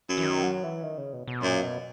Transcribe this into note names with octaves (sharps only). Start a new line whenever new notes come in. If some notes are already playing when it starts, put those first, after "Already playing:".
F#2
E3
D#3
F#3
E3
D#3
C#3
B2
B2
F#2 A#2
B2